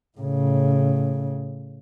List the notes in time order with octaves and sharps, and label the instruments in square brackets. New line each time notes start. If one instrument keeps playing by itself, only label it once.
[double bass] A2 C#3